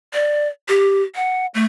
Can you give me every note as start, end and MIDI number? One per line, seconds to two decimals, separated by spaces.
0.13 0.48 74
0.69 1.02 67
1.15 1.46 78
1.54 1.65 57